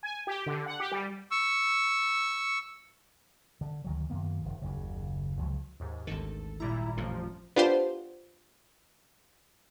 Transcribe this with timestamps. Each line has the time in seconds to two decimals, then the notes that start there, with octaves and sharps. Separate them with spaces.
0.03 G#5
0.27 G4
0.46 D3
0.66 F#5
0.80 G4
0.91 G3
1.31 C#6 E6
3.61 D3
3.84 D2 D#3 F#3
4.10 F#2 D#3 A#3 B3
4.42 F1 A#1 D#3
4.62 F#1 D#2 C#3
5.39 C#2 F3 F#3
5.80 D#2 G#2
6.07 G#1 D2 D#3 A4
6.60 A#2 G3 E4 A#5
6.97 A1 F2 A2 F3
7.56 B3 D4 F4 G4 C5